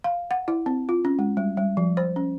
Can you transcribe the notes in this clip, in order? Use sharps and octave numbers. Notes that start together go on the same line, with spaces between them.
F5
F#5
E4
C4
F4
C#4
G#3
G3
G3
F3
C5
C#4